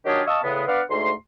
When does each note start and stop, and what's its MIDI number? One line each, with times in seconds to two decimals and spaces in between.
0.06 0.21 51
0.06 0.21 54
0.06 0.21 62
0.06 0.21 65
0.06 0.21 67
0.06 0.21 68
0.27 0.39 75
0.27 0.39 77
0.27 0.39 81
0.27 0.39 85
0.27 0.39 87
0.27 0.39 88
0.43 0.63 40
0.43 0.63 45
0.43 0.63 49
0.43 0.63 56
0.43 0.63 59
0.67 0.81 59
0.67 0.81 62
0.67 0.81 71
0.67 0.81 74
0.67 0.81 77
0.67 0.81 78
0.90 1.12 38
0.90 1.12 44
0.90 1.12 57
0.90 1.12 84